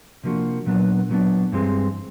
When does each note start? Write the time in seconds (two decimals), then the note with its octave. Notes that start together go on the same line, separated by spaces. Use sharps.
0.24 C3 F3 A#3 D4 F#4
0.66 A#2 F#3 B3 D4
1.09 A#2 F#3 B3 D4
1.52 G2 E3 G#3 C4 E4